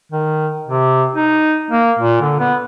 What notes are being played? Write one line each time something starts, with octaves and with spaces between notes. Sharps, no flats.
D#3
C3
D#4
A#3
A#2
D3
B3